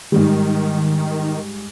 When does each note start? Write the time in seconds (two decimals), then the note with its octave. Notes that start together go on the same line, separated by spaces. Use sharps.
0.12 G#2 D#3 G3